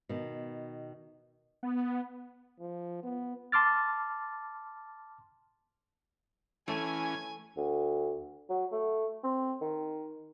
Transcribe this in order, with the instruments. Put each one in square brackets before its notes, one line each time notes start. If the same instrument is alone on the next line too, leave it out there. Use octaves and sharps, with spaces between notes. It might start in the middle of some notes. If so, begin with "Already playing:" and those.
[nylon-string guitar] B2 D#3
[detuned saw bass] B3
[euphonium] F3
B3
[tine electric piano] A5 C6 D6 F6 A6
[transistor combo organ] E3 C#4 [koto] A3 [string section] G#5
[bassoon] D2
F#3
A3
C4
D#3